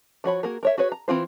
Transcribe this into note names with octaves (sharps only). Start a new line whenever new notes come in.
F3 F#4 C#5 B5
A#3 F#4 G#4 A#4
A#4 C#5 E5
F#4 G#4 B4 C#5
A#5
E3 C4 F4 C5